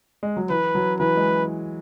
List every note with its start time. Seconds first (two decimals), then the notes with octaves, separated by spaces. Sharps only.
0.23 G#3
0.37 F#3
0.50 E3 B4
0.75 F#3
0.99 E3 B4
1.17 G#3